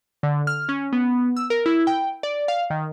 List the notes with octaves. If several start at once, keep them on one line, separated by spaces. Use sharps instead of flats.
D3
F6
C#4
B3
E6
A#4
E4
G5
D5
F5
D#3